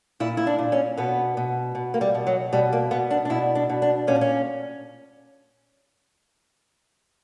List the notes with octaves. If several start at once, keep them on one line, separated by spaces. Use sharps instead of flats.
A#2 E4
E4
D4
A#2
C#4
B2 B3
B2
B2
A#3
G3
B2
F#3
B2 G3
A#3
B2 B3
D4
D4
B2 E4
D4
B2
D4
A#2 C#4
D4
C#4